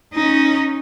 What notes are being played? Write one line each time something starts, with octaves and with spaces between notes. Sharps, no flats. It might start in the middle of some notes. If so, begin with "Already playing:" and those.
C#4 D#4